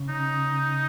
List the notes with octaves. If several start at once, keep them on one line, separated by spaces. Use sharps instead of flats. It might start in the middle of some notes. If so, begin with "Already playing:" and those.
Already playing: C#3
D#4